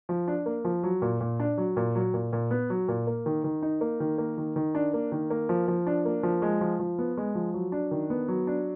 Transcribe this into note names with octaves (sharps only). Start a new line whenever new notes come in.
F3
D4
A#3
F3
F#3
A#2
A#2
D4
F#3
A#2
F#3
A#2
A#2
B3
F#3
A#2
A#3
D#3
D#3
D#4
A#3
D#3
A#3
D#3
D#3
D4
A#3
D#3
A#3
F3
F3
D4
A#3
F3
G#3
F3
F3
B3
G#3
F3
F#3
D4
D#3
B3
F#3
D4